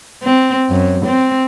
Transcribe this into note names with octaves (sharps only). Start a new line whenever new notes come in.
C4
F#2
C4